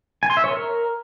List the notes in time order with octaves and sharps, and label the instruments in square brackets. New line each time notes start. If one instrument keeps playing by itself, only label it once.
[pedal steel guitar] G#5
C6
E5
C#5
A#4